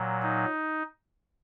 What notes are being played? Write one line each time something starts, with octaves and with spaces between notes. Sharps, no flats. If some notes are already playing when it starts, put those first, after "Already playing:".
Already playing: A#2 F#3
D#4